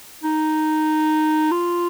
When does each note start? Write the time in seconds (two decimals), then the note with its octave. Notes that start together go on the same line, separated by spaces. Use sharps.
0.24 D#4
1.51 F4